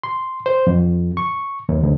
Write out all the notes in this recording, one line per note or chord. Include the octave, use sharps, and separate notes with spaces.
C6
C5
F2
C#6
D#2
D2